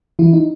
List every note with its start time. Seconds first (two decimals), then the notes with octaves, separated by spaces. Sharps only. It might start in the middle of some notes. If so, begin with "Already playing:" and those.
0.19 E3 E4
0.33 D#4